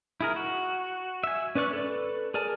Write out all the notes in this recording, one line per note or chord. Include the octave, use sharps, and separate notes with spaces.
E4 G#4 A#4
F#4
E5 G#5
C#4 B4 D5 C#6 F#6
A4 B4 D5
G#4 A#4 D5 G#5 A5